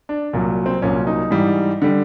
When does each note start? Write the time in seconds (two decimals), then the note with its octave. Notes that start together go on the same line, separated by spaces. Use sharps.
0.09 D4
0.33 C2 A#2 F#3
0.66 C4
0.82 C2 A#2 F#3 C#4
1.07 D#4
1.31 G#2 E3 G3
1.82 D3 G3